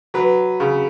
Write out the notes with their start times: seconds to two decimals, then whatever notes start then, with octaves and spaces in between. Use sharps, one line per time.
0.14 F#3 B4
0.60 C#3